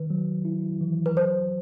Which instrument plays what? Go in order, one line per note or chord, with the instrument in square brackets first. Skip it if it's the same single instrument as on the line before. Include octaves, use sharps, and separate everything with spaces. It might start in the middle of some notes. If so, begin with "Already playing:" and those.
Already playing: [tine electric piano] D#3 [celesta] B4
[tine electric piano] F#3
E4
E3
[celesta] B4
[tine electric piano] F#3 [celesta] C5